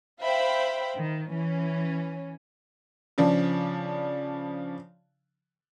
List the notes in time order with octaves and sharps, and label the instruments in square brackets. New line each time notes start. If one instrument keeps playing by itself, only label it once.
[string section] C5 E5 F5 G5 B5
D#3
E3 C#4
[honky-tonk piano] C#3 F3 D4